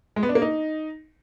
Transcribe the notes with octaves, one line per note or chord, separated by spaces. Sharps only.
G#3
B3
D4
A#3
D#4